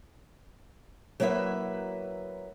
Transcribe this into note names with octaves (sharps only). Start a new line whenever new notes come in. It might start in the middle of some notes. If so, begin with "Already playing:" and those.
F#3 A#3 B3 E4 B4 E5